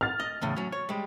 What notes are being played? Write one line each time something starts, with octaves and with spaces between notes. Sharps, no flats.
F6 A6
D#5
E2 A2 C#3
F#3 C#4
C#5
G3 G#3